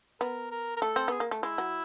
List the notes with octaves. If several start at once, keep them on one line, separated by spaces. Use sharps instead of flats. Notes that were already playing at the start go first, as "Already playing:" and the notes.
B3 A#4
A#4
A#4
A3 A4
C4
B3 G#4
A#3
A3
G#3 E4
F#3